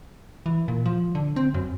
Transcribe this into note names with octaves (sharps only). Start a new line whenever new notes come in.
E3
A#2
F3
D3
C4
F#2